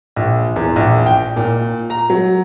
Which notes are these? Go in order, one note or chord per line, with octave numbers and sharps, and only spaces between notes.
A#1
E2
A#1
G5
A#2
A#5
F#3